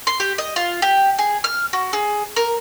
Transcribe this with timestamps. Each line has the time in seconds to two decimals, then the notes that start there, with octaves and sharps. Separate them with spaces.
0.07 C6
0.20 G4
0.38 D#5
0.56 F4
0.82 G4
1.19 G#4
1.44 F6
1.73 F#4
1.93 G#4
2.36 A#4